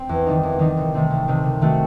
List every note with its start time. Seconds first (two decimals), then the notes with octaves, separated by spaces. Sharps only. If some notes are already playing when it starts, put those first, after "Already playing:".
Already playing: C4
0.09 E2
0.26 D#3 G3 D#4
0.43 E2
0.59 D#3 G3 D#4
0.77 C2
0.94 C3 D#3 A3 C4
1.11 C2
1.28 C3 D#3 A3 C4
1.45 C3
1.61 D#3 A3 C4 F#4